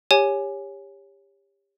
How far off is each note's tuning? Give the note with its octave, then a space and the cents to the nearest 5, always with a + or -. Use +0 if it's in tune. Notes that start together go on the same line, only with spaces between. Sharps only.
G4 +25 C#5 +0 G#5 +5